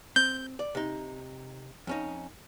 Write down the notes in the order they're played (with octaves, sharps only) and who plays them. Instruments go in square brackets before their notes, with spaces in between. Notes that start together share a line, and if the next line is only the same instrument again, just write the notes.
[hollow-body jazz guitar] C4 [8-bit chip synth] G6
[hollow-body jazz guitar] D5
C3 D#4
F2 C#4 D#4